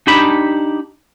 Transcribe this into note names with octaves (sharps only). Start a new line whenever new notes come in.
D4 D#4 G4 A5 B5